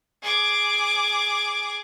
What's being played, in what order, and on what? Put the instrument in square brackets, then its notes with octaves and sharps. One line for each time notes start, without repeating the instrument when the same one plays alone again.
[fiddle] G#4 D6